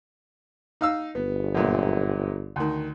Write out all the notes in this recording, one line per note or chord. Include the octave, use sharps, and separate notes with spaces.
D#4 F5 E6
G1 B3
F#2 A#2
D2 D#3